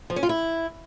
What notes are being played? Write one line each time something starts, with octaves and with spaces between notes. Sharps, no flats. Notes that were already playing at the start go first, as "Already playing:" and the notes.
F3
C#4
F4
E4